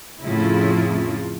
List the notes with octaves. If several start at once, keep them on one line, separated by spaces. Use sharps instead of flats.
F2 A2 C#3 E4 F4